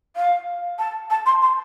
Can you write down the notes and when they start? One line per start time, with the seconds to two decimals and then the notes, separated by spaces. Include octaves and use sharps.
0.16 F5
0.79 A5
1.10 A5
1.26 C6
1.42 C6